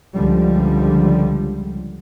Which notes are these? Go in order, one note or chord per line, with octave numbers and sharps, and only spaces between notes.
C#2 D3 F3 G3